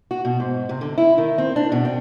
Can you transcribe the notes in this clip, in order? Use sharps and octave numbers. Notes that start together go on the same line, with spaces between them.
F#4
B2
G#2
C3
D3
E4
D#3
C4
D4
B2
G5